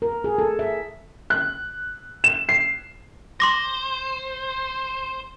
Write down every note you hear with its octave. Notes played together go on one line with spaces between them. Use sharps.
A#4
G#4
A4
E5
F#6
E7
C7
C5 C6 D6 A#6